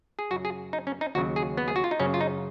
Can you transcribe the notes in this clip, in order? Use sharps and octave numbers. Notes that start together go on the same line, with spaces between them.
G#4
F#2 C#3 F#3 F#4
G#4
D#4
C#4
D#4
D#2 C#3 F#3 F#4
G#4
B3
G#4
F#4
F4
D#4
F#2 C#3 F#3 C#4
F4
D#4